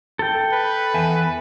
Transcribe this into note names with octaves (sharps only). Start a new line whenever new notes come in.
A4 G5
B4
E2 E5 G#5